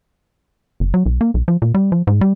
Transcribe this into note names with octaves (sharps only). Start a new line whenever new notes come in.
F#1
F#3
B1
A#3
B1
F3
A#2
G3
F3
G#2
G3